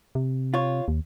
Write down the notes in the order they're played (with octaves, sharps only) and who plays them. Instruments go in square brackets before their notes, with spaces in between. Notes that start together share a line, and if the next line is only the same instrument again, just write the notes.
[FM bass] C3
[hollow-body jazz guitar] F4 C#5
[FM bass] D#2